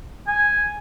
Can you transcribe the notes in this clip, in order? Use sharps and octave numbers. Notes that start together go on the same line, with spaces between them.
G#5